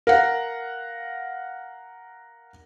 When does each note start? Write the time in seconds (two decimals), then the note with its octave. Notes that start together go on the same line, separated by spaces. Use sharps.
0.07 A#4 F5 F#5